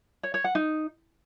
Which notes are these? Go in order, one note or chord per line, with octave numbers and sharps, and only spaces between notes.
C#5
C#5
F#5
D#4